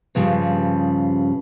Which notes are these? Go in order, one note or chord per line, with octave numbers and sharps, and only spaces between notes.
G2 C#3 F3 G3